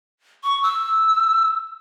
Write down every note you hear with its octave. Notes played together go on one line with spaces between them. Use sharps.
C#6
E6